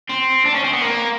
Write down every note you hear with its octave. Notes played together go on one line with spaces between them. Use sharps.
C4
D4
C#4
C4
B3
A#3